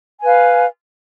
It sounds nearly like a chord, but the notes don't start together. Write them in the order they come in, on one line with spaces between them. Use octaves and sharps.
G#5 B4 F5